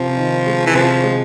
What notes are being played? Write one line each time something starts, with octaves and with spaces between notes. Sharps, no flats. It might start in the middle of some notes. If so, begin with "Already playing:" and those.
Already playing: C3 F3
D#3
G#3
E3
C3 F3
G#3